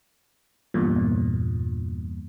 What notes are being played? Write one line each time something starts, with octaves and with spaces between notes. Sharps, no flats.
E2 G2 A#2